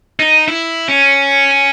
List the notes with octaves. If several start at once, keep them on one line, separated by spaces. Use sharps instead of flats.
D#4
E4
C#4